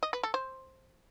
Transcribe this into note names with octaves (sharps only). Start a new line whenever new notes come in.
D#5
B4
A4
C5